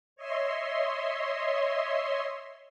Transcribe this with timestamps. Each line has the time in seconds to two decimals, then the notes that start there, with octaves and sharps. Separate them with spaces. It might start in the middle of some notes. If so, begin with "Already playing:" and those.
0.16 C#5 D#5 E5 C6